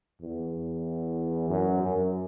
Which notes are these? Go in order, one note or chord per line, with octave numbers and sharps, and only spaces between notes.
E2
F#2
F#2